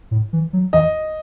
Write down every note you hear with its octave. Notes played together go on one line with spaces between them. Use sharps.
A2
E3
F#3
E3 D#5